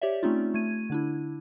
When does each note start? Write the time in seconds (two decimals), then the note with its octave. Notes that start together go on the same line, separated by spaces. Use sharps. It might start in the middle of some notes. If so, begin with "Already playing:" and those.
0.02 G4 C#5 D5 E5
0.23 A3 C4 C#4 D#4 F4
0.54 A3 G#6 D#7
0.90 D3 D4 E4